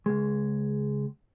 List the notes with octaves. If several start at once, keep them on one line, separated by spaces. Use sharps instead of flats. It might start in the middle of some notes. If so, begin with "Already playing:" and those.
C#2 G#3